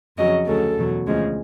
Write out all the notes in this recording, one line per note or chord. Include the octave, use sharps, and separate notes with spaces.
F2 C#3 F#3 D#5
D2 C#3 F#3 A4
E2 B2 F#3
D2 C#3 F3 G#3